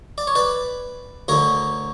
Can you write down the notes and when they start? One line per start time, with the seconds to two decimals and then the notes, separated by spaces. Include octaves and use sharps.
0.18 D5
0.27 C#5
0.36 B4 D5
1.28 D2 D3 A#4 C#5